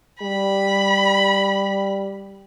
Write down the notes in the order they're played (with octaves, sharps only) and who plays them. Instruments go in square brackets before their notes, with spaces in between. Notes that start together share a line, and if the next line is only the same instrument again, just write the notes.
[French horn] G3 [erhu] B5